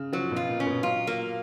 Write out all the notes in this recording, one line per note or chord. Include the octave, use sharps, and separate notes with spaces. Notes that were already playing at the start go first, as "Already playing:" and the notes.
Already playing: C#3
F3 F#3
B2
F4
A#2
C#4
B2
F#3 F4
A#3